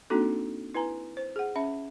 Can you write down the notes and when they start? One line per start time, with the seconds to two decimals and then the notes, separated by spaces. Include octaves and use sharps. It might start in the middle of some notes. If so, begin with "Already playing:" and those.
0.10 A#3 C4 D4 D#4 F#4 A4
0.74 E4 B4 G#5 A#5
1.17 C5
1.36 G#4 F#5
1.56 C#4 E5 B5